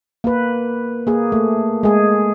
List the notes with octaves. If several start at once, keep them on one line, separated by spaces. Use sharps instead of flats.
A#3 B4
A#3 G#4
A3
G#3 G#4